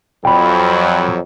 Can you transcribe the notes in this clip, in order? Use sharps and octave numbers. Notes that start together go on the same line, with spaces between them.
F2 F#3 G5 B5